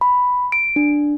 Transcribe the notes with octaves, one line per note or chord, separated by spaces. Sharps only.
B5
D7
D4